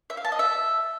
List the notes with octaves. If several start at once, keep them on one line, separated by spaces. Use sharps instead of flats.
E5
F5
A5
D#5
E5